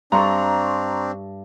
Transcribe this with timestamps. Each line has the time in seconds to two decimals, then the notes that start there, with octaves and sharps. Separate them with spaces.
0.12 G2 C4 D4 A4 A#5 C6 C#6